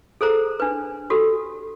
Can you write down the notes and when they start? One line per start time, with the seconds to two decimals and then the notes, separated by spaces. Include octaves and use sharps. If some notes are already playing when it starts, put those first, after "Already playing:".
0.21 G#4 A4 C5 A#5
0.60 D4 B4
1.10 F#4 G4 A4